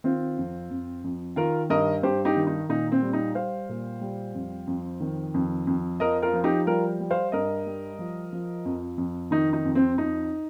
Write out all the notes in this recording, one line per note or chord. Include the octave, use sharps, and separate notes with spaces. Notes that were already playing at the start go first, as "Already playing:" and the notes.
D#3 C4 F4
F2
F2
F2
D#3 F4 A#4
G2 A#4 D#5
G2 G4 C5
D#4 G4
D#3
D#4
A#2 D#4
C4
G3
D#4
G3 C5 F5
A#2
G3
F2
F2
D#3
F2
F2
F3 A#4 D#5
F4 A#4
F3
D#4 G4
G3 F4 A#4
G3
C5 F5
G2 A#4 D#5
G3
F3
F3
F2
F2
D#3 D#4
D#4
F2
C4
F2 D#4